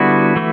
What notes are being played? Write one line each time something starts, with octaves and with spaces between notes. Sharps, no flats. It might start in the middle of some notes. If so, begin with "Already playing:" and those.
Already playing: D3 G3 B3 E4 F#4
E3 A3